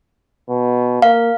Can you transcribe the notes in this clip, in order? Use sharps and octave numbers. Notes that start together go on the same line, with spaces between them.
B2
A#3 F5